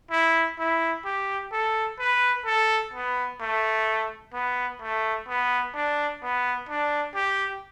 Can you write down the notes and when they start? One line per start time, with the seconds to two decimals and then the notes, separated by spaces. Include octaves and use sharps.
0.11 E4
0.59 E4
1.05 G4
1.52 A4
1.99 B4
2.46 A4
2.94 B3
3.40 A3
4.34 B3
4.82 A3
5.28 B3
5.74 D4
6.22 B3
6.69 D4
7.15 G4